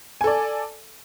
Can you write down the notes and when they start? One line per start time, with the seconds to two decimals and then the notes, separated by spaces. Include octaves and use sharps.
0.21 G#5
0.24 A4
0.27 D5